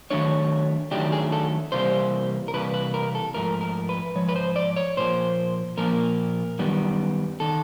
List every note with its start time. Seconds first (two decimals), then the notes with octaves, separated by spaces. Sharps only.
0.10 D#3 F#3 A3 D4 C#5
0.91 D#3 F#3 A3 D4 G4
1.12 G#4
1.32 A4
1.72 C3 E3 G3 A#3 C5
2.48 A#4
2.54 C3 E3 G3 A#3 B4
2.74 B4
2.94 A#4
3.15 A4
3.35 G#2 F3 A3 A#4
3.61 A#4
3.89 B4
4.15 G#2 F3 C#5
4.29 B4
4.36 C5
4.56 D5
4.76 C#5
4.97 A#2 F3 A#3 C5
5.77 A#2 F3 A#3 A#4
6.59 F#2 D#3 G3 B3
7.40 D#3 A4